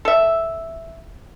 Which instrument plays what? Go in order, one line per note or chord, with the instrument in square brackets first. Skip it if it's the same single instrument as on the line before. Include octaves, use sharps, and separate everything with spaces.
[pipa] A4 E5